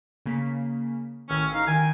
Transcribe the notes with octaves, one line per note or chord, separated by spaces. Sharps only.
C#3 A#3 B6
A1 D#3 C#4 E6 F6
D#4 F5
D#3 G#5